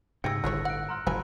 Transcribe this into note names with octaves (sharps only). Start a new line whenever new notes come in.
G#2 C#3 G4 G5 E6 A#6 C#7
G1 A2 D3 F4 G#4 C#5 F#6
F#5 F#6 D7
A#5 C6 F6
F#1 F3 F#3 G#5 B5